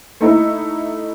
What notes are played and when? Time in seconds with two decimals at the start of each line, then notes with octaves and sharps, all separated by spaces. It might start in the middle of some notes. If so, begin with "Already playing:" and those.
0.21 A3 D#4 E4